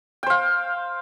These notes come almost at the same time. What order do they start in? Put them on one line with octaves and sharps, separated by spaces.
G5 C5 F5